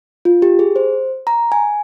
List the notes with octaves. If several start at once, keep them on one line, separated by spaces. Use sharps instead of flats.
F4
G4
G#4
C5
A#5
G#5